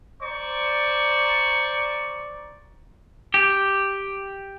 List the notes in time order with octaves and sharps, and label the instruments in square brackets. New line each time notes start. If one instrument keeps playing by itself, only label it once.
[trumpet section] C5 D5 A#5 C#6
[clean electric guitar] G4